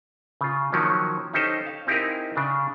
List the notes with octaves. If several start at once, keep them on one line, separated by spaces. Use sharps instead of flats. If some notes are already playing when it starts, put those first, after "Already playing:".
C#3 F4
D#3 F3 F#3 A#3 C#4
C#4 D#4 G4 A4 C5
F5
C4 D#4 E4 G4 G#4 A#4
C#3 D4